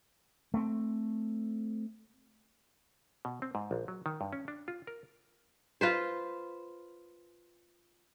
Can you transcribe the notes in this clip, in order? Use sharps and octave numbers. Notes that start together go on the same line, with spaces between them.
A3 C4
B2
C4
G#2
A#1
F#3
D#3
G2
C#4
D4
F4
A#4
F4 B4 C5